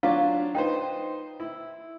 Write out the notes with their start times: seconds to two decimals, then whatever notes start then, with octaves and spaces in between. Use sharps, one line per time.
0.03 F#3 D4 F4 F5
0.55 D#4 B4 C5 G5
1.40 E4